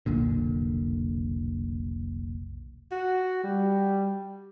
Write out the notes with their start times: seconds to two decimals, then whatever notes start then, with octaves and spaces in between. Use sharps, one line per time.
0.06 F1 B1 A#2 D3
2.92 F#4
3.44 G3